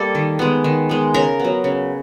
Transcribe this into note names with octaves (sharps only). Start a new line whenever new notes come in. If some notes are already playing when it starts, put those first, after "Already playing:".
Already playing: G3 A#3 A4
D#3
G#3 B3
D#3
G#3 B3
C#3 A#4
F#3 B3
C#3